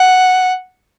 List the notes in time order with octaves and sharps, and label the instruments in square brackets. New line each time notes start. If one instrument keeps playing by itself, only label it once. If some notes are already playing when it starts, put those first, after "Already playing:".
Already playing: [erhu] F#5